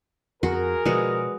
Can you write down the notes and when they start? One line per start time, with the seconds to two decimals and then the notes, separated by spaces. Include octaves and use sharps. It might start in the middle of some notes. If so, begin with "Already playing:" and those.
0.43 F2 F#4 G#4 A#4
0.85 B2 F3 G#3 F#4 B4 D5 D#6